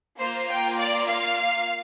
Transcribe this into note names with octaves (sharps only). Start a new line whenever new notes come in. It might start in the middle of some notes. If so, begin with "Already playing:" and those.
A#3 F4 C5
G5
D5
F5